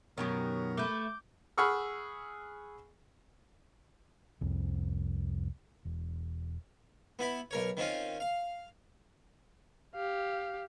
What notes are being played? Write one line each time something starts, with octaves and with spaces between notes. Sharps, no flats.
F#2 B2 D#3 F#3 B3 G4 A#4
A3 B4 D6 G6
G#4 F#5 B5 C#6 E6 F6
C2 F2
E1
B3 E4 B5
B1 A#4 C#5
D#3 C4 C#4 F4
F5
G4 F5